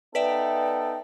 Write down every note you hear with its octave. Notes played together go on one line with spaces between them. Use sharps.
B3 D#4 A4 B4 D5 E5 G5